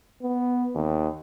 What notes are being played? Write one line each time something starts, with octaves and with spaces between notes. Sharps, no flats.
B3
D#2